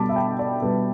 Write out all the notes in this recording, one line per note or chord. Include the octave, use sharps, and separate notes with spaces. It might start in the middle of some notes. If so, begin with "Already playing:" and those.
Already playing: B2 G3 A5 B5 D6
E5
G5
D5
B2 G3 B4